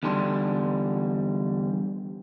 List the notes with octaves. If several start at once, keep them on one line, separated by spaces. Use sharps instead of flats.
E2 D3 G3 A5 C6